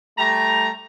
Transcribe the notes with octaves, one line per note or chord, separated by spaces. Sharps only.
G3 A3 A#5